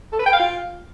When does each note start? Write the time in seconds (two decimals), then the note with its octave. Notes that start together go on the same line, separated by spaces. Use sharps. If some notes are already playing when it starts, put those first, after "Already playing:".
0.12 A4
0.19 B4
0.26 G5
0.33 F5
0.40 F4